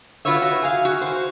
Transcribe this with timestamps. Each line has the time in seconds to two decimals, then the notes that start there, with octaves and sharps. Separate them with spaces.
0.25 F4 F#4 B4 C#5 E5
0.42 F#4
0.62 G#4 F5
0.85 F#4
1.01 C5